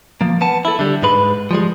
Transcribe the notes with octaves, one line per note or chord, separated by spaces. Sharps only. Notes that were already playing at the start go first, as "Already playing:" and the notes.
F3 A#3
B3 A5
E4 A4
D3 G3
G#2 G#3 B4 B5
F3 G3 G#3